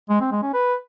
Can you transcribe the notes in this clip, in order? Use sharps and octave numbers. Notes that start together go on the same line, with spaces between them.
G#3
C4
G#3
C#4
B4